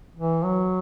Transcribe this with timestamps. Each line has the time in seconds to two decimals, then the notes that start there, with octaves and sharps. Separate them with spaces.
0.16 E3
0.44 F#3